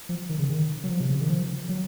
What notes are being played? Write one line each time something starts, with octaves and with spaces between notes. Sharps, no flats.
F3
D#3
C#3
D#3
F#3
F3
C3
C#3
D#3
F3
F#3